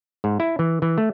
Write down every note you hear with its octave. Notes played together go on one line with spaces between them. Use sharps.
G#2
E4
E3
E3
A3